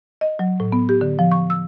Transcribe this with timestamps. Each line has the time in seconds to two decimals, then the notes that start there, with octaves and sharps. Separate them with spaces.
0.21 D#5
0.39 F#3
0.60 A2
0.72 B3
0.89 G4
1.01 D3
1.19 F3
1.31 C#6
1.50 E6